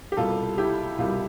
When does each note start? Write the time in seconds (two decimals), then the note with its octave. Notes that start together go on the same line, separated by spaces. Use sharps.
0.12 G4
0.17 C2 B2 G3 F4 A4
0.58 E4 G4
0.99 C2 B2 G3 F4